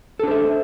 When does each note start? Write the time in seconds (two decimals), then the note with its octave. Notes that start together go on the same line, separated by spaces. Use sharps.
0.19 A4
0.23 D4
0.27 C5
0.31 E5